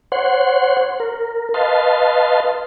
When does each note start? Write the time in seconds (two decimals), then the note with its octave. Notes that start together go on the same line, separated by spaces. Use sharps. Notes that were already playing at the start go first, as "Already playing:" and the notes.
0.12 C5 C#5 F#5 C6
1.00 A#4
1.54 B4 D#5 F5 A5 C6